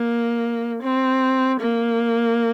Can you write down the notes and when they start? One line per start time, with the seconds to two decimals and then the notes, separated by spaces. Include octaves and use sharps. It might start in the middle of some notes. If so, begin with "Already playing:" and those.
Already playing: A#3
0.83 C4
1.60 A#3